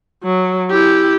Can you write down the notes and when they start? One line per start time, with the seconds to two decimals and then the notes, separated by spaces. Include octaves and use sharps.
0.23 F#3
0.71 E4 G4